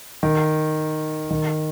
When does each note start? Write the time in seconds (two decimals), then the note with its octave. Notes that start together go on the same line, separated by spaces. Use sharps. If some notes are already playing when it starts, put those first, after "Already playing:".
0.23 D#3
1.31 D#3